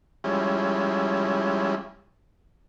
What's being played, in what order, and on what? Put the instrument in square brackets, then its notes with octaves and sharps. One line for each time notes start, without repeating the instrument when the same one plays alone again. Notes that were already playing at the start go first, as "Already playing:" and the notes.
[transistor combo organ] F3 G3 G#3 C#4 E4